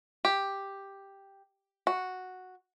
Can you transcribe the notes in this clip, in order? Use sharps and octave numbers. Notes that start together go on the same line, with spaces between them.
G4
F#4